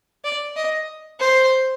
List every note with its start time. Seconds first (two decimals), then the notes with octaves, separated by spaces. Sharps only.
0.24 D5
0.56 D#5
1.20 C5